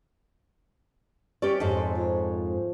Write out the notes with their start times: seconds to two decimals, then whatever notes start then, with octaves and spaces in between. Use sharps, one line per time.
1.42 C#4 G4 C#5 D5 E5
1.60 F2 G#2 A4
1.95 F3